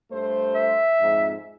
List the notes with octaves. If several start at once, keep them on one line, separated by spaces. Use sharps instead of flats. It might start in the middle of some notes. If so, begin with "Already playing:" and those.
G2 A3 C5
E5
F2 G#2